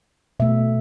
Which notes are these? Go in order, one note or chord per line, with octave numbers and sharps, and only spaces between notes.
B2 A3 E5